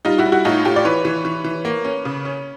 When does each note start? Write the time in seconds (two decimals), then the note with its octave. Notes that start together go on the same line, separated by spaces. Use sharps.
0.05 G3 D#4 F4
0.18 E4 F#4
0.26 G3
0.32 E4 F#4
0.45 A2 D#4 F4
0.65 A2 F4 G4
0.76 D5
0.85 E3 B4 C#5
1.05 E3
1.25 E3
1.44 E3
1.65 A#3
1.85 C#4
2.05 C#3
2.25 C#4